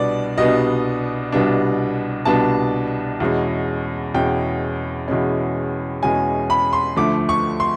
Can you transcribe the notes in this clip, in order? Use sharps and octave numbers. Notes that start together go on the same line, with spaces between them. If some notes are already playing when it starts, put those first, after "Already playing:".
Already playing: C2 B2 G3 B3 D4 D5
C2 B2 G3 B3 D4 D#5
C2 B2 G3 B3 D4
C2 B2 G3 B3 D4 A5
E2 B2 G#3 C#4
E2 B2 G#3 C#4 G5
E2 B2 G#3 C#4
E2 B2 G#3 C#4 G#5
B5
C6
D2 D3 F3 A3 D6
C#6
C6